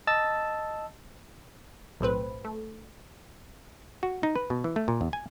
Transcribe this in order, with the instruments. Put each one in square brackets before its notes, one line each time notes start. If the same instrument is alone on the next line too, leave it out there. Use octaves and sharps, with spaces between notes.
[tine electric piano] D#5 A5 E6 A6
[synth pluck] B1 A2 C4 B4
A3
[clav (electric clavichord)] F#4
D#4
B4
B2
E3
A3
A#2
E2
G#5